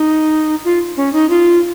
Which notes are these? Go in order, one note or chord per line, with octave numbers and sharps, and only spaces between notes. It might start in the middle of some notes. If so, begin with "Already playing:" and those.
Already playing: D#4
F4
C#4
D#4
F4